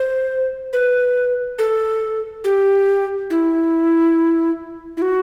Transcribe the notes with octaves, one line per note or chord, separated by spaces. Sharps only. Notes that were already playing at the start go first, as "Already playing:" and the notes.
Already playing: C5
B4
A4
G4
E4
E4
F#4